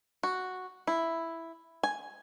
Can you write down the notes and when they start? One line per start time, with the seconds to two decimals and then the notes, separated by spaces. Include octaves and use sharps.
0.23 F#4
0.87 E4
1.83 G#5